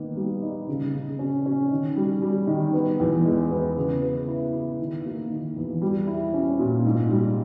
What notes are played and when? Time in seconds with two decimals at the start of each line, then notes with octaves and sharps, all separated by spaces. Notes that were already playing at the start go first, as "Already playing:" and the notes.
Already playing: D#3 A#3 B3
0.16 G3
0.42 D#4
0.68 C#3
0.94 C#3
1.19 C#4
1.46 C#4
1.71 D#3
1.96 G3
2.22 G3
2.47 D#3
2.73 B3
3.00 E2
3.25 G#3
3.51 B3
3.77 C#3
4.02 B3
4.28 E4
4.53 E4
4.79 D#3
5.05 A#3
5.30 D#3
5.57 E2
5.81 G3
6.07 E4
6.34 C#4
6.59 A#2
6.85 G#2
7.10 G3